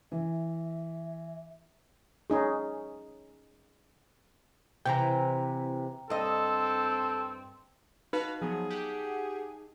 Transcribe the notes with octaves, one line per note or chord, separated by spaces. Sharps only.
E3 E5
C#4 D#4 G#4
C3 E3 E4 G5 A#5
G2 C4 A4 D#5
D#4 F#4 B4 F5
F3 F#3 B3 G#4
G4 F#5